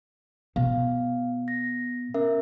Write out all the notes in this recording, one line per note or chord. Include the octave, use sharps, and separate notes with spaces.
B2 F5
A#6
C#4 A#4 E5